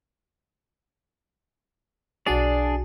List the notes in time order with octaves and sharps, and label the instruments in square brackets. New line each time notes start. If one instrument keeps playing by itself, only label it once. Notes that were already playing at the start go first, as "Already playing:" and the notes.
[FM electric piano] B1 F#4 A5 [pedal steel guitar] D4 G#4 D5